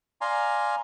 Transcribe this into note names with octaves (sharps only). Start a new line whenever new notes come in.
D5 F5 G#5 A#5 C6